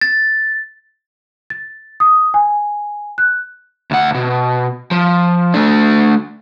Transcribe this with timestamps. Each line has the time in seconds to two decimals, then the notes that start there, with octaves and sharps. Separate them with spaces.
0.01 A6
1.50 A6
2.00 D#6
2.34 G#5
3.18 F#6
3.91 D2 F#5
4.14 B2
4.91 F3
5.54 A3 D4